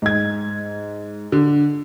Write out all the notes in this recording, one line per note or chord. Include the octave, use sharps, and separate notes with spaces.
G#2 G#6
D3